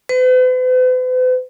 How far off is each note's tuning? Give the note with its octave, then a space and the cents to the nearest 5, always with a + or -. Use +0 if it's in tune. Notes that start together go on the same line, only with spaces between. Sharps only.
B4 +45